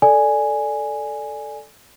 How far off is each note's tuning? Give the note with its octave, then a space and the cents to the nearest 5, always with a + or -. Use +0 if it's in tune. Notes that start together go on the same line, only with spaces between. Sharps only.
A4 +0 D5 +0 G#5 +0